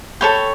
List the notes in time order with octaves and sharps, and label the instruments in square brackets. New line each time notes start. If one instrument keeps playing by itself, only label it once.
[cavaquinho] A4 C#5 G5 B5